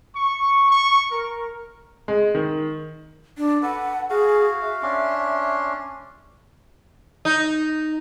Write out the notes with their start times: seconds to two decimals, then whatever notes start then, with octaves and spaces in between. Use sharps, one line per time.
0.15 C#6
0.68 C#6
1.11 A#4
2.08 G#3
2.35 D#3
3.38 D4
3.62 A4 B4 F#5
4.10 F#4 G#4 F5
4.62 E5
4.83 C#4 D4 C6
7.25 D#4